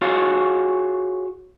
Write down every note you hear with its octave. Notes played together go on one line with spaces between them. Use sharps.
F4 F#4 G#4 C#5 F5 F#5